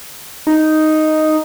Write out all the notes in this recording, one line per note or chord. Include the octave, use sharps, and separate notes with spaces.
D#4